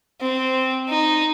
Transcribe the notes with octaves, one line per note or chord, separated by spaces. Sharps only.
C4
D#4